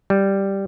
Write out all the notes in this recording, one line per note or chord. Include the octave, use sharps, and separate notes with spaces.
G3